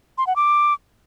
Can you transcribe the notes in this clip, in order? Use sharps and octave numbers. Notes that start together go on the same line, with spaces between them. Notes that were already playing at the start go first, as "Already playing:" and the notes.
C6
F#5
D6